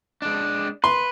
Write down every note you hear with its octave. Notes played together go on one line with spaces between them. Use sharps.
G#3 D4
B4 C6